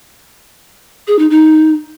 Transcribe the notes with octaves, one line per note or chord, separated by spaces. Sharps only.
G#4
D#4
D#4